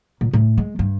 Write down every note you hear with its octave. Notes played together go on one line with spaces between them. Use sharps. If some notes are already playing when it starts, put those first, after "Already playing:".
A#2
A2
G#3
G2